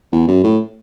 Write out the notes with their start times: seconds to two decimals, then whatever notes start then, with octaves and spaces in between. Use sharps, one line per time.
0.12 E2
0.28 F#2
0.44 A2